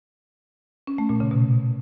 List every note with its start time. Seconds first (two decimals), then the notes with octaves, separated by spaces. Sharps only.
0.87 C#4
0.98 A3
1.09 A#2
1.20 C#3
1.31 B2